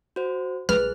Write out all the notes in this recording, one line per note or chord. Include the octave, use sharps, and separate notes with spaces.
F#4 C5
A#1 G3 G#4 B4 F6 F#6